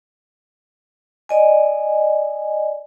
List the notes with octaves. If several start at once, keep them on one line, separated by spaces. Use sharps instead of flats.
D5 D#5 G#5